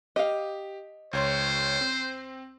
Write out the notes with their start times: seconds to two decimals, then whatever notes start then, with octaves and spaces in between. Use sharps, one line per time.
0.16 G4 D#5 F5
1.13 C#2 C5 C#5 C6
1.81 C4